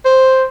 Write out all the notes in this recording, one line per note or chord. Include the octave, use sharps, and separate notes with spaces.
C5